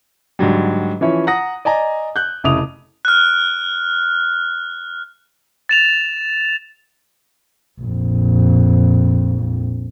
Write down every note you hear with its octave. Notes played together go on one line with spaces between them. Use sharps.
G#2 D3 F#3 G3
E3 F3 C#4 E4 C#5
F#5 A#5 D#6 A#6
D5 D#5 G#5 A#5
F#6 G6
F1 C#3 E4 D6 D#6 F7
F6 F#6
A6 E7 F7
A#1 F2